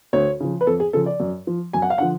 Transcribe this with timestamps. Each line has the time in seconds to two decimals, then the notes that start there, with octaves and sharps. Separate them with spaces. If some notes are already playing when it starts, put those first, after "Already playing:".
0.13 D2 C#5
0.40 C#3 F3
0.61 B4
0.67 F2 A4
0.80 G#4
0.93 C#3 F3 A4
1.06 D5
1.20 F#2
1.47 F3
1.73 F#2 G#5
1.82 F#5
1.90 F5
1.98 D3 F3 F#5